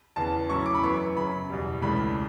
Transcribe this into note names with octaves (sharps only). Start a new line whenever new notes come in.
E2 C#3 E3 B3 A5
A2 F#3 C#4 E4 C#6
D6
B5
F#2 E3 B3 C#6
F#2 C#3 F#3 B5
E2 B2 G3
C#2 C#3 E3 A3 D4 B5